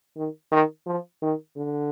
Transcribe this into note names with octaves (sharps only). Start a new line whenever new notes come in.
D#3
D#3
F3
D#3
D3